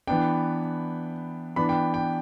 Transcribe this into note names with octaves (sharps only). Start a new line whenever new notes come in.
E3 B3 D4 G5
E3 B3 D4 B5
G5
G5